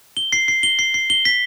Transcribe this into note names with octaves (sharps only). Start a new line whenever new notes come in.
G7
C7
C7
G7
C7
C7
G7
B6